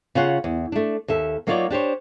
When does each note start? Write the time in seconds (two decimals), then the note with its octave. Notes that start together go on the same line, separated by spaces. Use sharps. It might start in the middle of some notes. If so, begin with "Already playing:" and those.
0.15 C#3 F4 C#5 F#5
0.44 E2
0.72 A3 D4
1.08 D#2 A4 E5
1.47 F#3 A#3 D#4 F4 C#5 D5
1.70 D4 G4 C5 C#5